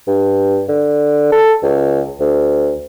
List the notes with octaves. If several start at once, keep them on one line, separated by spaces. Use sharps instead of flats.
G2
D3
A4
C#2
D2